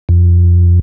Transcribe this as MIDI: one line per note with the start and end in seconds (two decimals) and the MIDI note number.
0.09 0.79 41